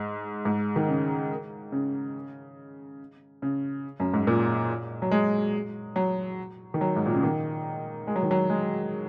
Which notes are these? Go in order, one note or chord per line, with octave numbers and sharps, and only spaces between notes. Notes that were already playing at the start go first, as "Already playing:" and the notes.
Already playing: G#2
G#2
D#3
C#3
C#3
C#3
F#2
G#2
A#2
F#3
G#3
F#3
D#3
F#3
G#2
A#2
C#3
D#3
G#3
F#3
D#3
F#3
G#3